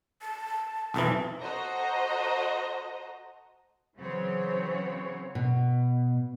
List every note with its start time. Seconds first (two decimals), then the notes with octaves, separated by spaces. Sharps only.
0.22 A5
0.94 B1 F2 E3 A5
1.41 F#4 A4 C5 D#5 A#5
3.96 C#3 E3 F#3 C4 C#5
5.35 B2